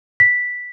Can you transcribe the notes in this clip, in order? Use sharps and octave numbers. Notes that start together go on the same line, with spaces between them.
B6